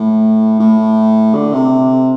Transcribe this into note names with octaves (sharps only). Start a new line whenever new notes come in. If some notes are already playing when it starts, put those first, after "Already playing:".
Already playing: A2
A2
D3
C3